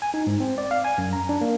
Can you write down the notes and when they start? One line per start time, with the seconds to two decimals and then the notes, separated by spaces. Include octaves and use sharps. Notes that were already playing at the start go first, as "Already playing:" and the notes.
0.02 G#5
0.14 D#4
0.27 G#2
0.40 C4
0.58 D5
0.71 F5
0.84 G#5
0.98 F#2
1.13 A#5
1.29 D4
1.41 A#3